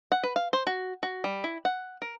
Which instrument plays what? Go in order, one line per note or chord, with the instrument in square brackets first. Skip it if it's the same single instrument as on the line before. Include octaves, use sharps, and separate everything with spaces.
[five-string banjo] F#5
B4
F5
C5
F#4
F#4
G3
E4
F#5
A#4